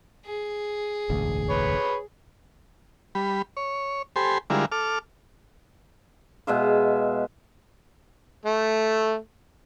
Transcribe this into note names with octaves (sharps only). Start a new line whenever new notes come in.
G#4
E1 A1 D2
B4 C#5
G3 B5
C#5
G4 A4 C5 G#5 B5 C6
D3 G3 G#3 E4 F4 A#4
A4 D6 F6
B2 G#3 E5 F5
A3